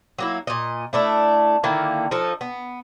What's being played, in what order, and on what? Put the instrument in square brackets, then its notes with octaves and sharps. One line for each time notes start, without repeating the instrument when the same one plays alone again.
[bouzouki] F#3 A#3 E4
A#2 D#5
A3 D4 E4
D3 D#3 A#3 E4
F3 D#4 A4
B3